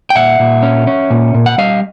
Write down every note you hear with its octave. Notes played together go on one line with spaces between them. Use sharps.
G5
A#2 E5 F#5
A#2
C#4
C#4
A#2
A#2
F#5
G3 D#5 F5